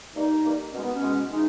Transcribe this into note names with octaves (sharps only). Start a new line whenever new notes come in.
G2 D#3 G3 A#3 D#4
G2 D#3 G3 A#3
B2 G#3 C#4
B3
C#4
B2 G#3
E3 G#3 D#4